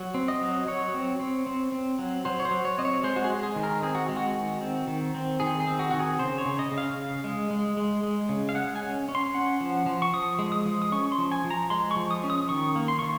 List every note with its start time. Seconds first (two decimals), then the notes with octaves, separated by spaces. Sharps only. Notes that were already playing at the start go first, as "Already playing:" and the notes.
Already playing: F#3
0.14 C4
0.28 D#5
0.41 F#3
0.67 F#3 C#5
0.94 C4
1.20 C4
1.46 C4
1.72 C4
1.99 F#3
2.25 F#3 C5
2.40 C#5
2.45 C5
2.51 F#3
2.65 C#5
2.78 C4 D#5
2.85 C#5
3.03 G#3 C5
3.16 F#4
3.24 G#4
3.30 G#3
3.43 G#4
3.56 D#3
3.63 A#4
3.83 C4 G#4
3.95 F#4
4.09 G#3
4.17 F#4
4.35 D#3
4.61 C4
4.87 D#3
5.15 C4
5.40 D#3 G#4
5.60 G#4
5.67 C4
5.79 F#4
5.91 D#3 F#4
6.00 G#4
6.19 C#3 C5
6.38 C#5
6.46 C#3
6.59 D#5
6.72 C#3
6.78 F5
6.98 C#3
7.24 G#3
7.50 G#3
7.77 G#3
8.03 G#3
8.29 C#3
8.49 F5
8.55 G#3 F#5
8.76 G#5
8.82 C#4
9.09 C#4
9.15 C6
9.34 C#4 F#5
9.61 F3
9.86 F3
10.02 C#6
10.13 F3 D#6
10.39 G#3
10.52 D#6
10.66 F3
10.82 D#6
10.92 C#4 C#6
11.05 C#6
11.12 C6
11.18 F3
11.32 G#5
11.45 F3
11.50 A#5
11.70 G#3 C6
11.91 C#6
11.96 F3
12.11 D#6
12.24 C#4
12.30 D#6
12.49 D#3 C#6
12.76 A#3
12.88 C6
12.99 C#6
13.03 D#3